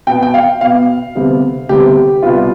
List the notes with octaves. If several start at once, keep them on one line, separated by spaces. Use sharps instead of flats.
B2 B3 G5
G5
F5
B2 B3 F5
D2 C3 G3 B3
D2 C3 G3 B3 G4
C2 B2 B3 F4